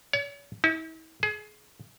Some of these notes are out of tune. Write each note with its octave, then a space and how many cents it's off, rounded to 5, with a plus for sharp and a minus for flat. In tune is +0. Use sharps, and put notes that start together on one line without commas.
C#5 +40
E4 -45
G#4 +25